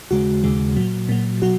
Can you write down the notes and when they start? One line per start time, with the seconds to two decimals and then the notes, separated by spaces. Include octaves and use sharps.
0.11 D#2 C#3 G#3 F#4
0.44 D#2 C#3 G#3
0.76 A#2 F#3
1.09 A#2 F#3
1.42 B2 F#3 F#4